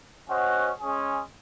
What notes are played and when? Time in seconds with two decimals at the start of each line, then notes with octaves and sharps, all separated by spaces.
0.29 C#4 F#4 C5 D#5 F#5
0.80 G#3 C#4 G#4